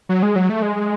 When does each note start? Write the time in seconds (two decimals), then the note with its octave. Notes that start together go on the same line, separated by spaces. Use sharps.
0.09 F#3
0.23 G#3
0.36 F#3
0.49 A3
0.62 G#3